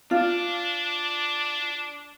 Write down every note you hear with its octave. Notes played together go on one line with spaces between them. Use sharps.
D4 F4